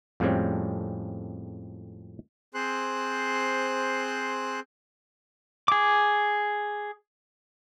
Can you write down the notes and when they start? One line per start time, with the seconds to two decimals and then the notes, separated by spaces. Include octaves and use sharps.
0.20 F2 A2 G3 G#3 C4 C#4
2.54 C4 G#4 C5 C6 F#6
5.68 G#4 D6